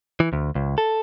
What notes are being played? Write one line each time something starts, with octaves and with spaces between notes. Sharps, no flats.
E3
D2
C#2
A4